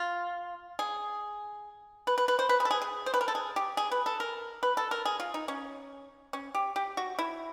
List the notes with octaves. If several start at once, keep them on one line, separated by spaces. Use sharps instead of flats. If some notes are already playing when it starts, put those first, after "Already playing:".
Already playing: F4
G#4
B4
B4
B4
C5
B4
G#4
A4
G#4
G#4
C5
B4
A#4
A4
G#4
G4
G#4
B4
A4
A#4
B4
A4
A#4
G#4
F4
D#4
C#4
C#4
G4
G4
F#4
E4